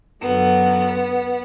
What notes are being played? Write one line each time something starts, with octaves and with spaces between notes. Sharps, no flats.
F#2 D3 F#3 B3